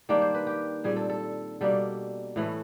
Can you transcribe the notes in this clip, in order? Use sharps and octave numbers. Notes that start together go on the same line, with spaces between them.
D#3 G3 A#3 D4
C5
B4
G4
A#2 G3 C4 G#4
A4
A4
B2 G3 A#3 D4 A4
A2 E3 A3